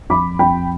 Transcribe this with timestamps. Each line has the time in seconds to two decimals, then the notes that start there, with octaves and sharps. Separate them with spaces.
0.10 F2 B5 D6
0.39 F2 G5 B5